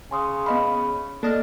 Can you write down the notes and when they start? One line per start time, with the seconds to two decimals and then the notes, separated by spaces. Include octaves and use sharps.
0.11 C#3 G#5 C6 D#6
0.46 B3 D#5 F5 B5
1.23 A#3 D4 A4 D#5 F6